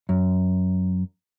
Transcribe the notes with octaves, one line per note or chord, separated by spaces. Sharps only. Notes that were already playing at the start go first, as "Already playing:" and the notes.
F#2